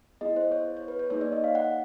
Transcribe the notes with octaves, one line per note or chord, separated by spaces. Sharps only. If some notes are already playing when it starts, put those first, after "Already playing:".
B3 E4 G#4 D#5
C5
C#5
C#5
B4
C#5
A#3 D#4 G#4 C#5
D5
D#5
F5
F#5